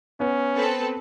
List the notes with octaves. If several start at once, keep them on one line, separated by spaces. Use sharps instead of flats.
B3 C#4
C4 A4 B4